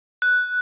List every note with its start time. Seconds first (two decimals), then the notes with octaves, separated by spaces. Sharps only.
0.22 F#6